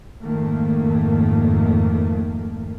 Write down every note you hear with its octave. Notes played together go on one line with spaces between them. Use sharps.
F2 G#2 D#3 A3 A#3